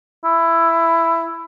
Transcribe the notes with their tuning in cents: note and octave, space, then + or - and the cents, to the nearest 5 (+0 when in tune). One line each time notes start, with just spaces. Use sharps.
E4 +10